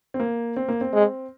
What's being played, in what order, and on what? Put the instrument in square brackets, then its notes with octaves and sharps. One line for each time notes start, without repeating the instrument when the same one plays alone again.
[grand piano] C4
A#3
C4
A#3
C4
[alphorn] G#3